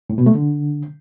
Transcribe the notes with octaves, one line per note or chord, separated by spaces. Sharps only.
A2
B2
A3
D3